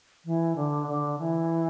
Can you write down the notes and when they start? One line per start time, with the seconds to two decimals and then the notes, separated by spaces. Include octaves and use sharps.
0.25 E3
0.56 D3
0.88 D3
1.19 E3